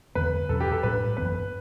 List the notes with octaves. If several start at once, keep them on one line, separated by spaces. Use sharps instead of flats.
E2 D3 G3 B3 B4
E2 B2 F#3 C#4 A4
G4
A4
A2 G3 D4 B4
F#2 E3 B3 B4